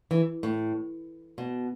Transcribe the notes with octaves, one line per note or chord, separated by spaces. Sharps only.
E3
A2
B2